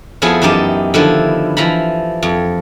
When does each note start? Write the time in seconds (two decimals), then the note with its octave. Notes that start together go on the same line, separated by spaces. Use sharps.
0.22 F2 F3 B3 E4 G#4
0.42 F#2 E3 D#4 G4 D5 A5
0.94 D3 D#3 F3 E4
1.57 E3 F3 A#5 B5
2.23 F2